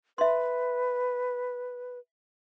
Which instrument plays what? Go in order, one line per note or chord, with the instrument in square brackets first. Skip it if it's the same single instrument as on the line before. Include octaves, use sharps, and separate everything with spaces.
[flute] B4 [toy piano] E5 C6